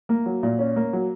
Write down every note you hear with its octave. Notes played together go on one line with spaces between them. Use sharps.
A#3
F#3
A#2
C#4
A#3
F#3